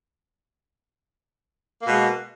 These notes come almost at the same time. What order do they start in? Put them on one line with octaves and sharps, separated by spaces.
A#3 B2 G#3